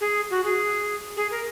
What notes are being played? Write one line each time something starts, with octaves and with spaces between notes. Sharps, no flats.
G#4
F#4
G#4
G#4
A#4